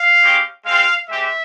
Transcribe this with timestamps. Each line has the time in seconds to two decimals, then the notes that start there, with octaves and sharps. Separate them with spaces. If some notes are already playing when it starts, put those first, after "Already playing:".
Already playing: F5
0.22 G#3 C#4 G4
0.65 G#3 C4 F4 F5
1.09 G#3 C4 G4 E5